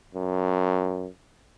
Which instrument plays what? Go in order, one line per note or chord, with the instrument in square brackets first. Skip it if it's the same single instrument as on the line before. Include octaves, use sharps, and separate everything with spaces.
[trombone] F#2